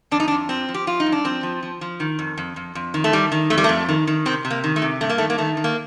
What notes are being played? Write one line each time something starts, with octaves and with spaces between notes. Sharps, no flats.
F2 D4
D#4
D4
F2
F3 C4
F3
G4
F3 F4
D#4
G2
D4
F3 C4
F3
F3
F3
D#3
F2
F2
F2
F2
D#3
A3
D#3 G3
D#3
F2 A3
G3
F2 A3
D#3
D#3
C3 C4
C3
A#3
D#3
A3
C3
G2 A3
A#3
D#3 A3
A#3
D#3 A3
D#3
A#3